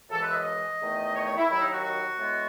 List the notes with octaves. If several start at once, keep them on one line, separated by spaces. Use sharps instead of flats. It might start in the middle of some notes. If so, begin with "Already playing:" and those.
F#2 C#3 E3 G#3 A4
B4
E5
D#5
D#5
E2 D#3 A3
C#5
D#5
C#5
E4
D#2 D#3 F#3 E4
D#4
F#4
F#4
A2 G#3 B3